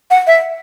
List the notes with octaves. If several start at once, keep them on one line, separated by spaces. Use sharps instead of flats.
F#5
E5